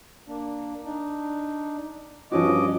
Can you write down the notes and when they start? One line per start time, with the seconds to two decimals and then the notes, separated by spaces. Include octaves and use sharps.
0.28 A#3 D4
0.85 D4 D#4
2.32 G2 F3 C#4 F#4 D#5 D6